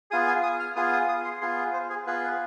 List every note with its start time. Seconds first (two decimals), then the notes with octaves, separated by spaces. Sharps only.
0.11 B3 F4 G#4 D#6
0.28 G#5
0.43 D#6
0.60 F6
0.75 B3 F4 G#4 D#6
0.93 D#6
1.09 D#6
1.25 C6
1.41 B3 F4 G#4 C6
1.73 C5
1.90 G#4
2.07 B3 F4 G#4 B4